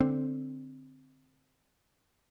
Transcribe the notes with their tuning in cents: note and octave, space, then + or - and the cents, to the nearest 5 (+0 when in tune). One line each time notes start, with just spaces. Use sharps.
D3 +0 C4 +0